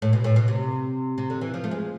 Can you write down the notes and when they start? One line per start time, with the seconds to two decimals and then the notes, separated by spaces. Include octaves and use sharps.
0.02 A2
0.13 B2
0.24 A2
0.36 B2
0.48 C3
1.18 C3
1.30 D3
1.41 E3
1.54 F3
1.64 A3
1.71 G#3